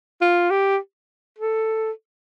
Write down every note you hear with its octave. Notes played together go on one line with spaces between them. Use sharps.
F4
G4
A4